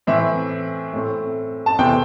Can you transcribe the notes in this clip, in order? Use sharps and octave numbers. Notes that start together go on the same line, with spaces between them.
A2 E3 C4 E5
A2 A3 C4
A5
E2 C3 E3 A3 C4 G5